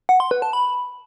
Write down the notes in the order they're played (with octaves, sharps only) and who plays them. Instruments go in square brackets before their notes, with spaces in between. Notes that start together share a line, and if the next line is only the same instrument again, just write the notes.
[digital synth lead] F#5
C6
B4
A5
B5